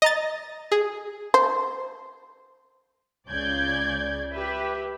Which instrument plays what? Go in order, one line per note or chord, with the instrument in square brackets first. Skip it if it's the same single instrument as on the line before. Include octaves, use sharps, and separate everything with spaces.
[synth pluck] D#5 A#5 A6
G#4
[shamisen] C5
[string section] C#2 C#3 D5 G6 G#6
G4 B4 E5